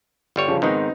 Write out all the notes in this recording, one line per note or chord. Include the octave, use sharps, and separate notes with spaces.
G1 G3 C#5
C#3 F3
G#2 D#3 B3 C4 D#4